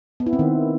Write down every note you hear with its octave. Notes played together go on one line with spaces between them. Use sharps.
B3
E4
C4
D#3